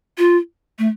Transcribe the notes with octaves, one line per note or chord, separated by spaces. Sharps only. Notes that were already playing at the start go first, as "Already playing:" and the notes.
F4
A3